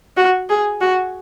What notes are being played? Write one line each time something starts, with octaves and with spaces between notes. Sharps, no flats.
F#4
G#4
F#4